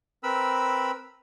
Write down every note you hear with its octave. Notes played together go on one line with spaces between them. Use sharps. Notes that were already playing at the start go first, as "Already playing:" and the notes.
C4 A#4 B4 B5 E6